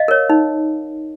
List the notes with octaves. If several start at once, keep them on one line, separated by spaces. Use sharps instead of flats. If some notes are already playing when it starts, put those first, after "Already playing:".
Already playing: D#5 F5
A#4 C#5
D#4